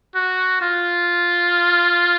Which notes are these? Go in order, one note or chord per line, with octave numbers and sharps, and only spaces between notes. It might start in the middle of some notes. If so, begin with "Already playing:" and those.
F#4
F4